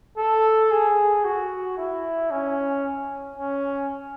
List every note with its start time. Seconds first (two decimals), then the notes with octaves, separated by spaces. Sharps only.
0.18 A4
0.71 G#4
1.24 F#4
1.78 E4
2.31 C#4
3.38 C#4